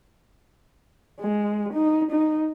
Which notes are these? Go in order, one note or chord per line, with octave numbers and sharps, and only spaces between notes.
G#3
D#4
D#4